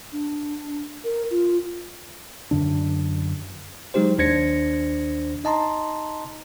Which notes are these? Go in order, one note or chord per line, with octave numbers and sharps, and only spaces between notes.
D4
A#4
F4
F#2 D3 D4
F#3 G#3 D#4 G4 C5
D#2 D4 C5 G#6 A#6 C#7
D#4 D#5 A5 A#5 C6